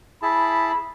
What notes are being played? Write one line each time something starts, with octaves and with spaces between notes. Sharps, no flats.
E4 G#4 A5 B5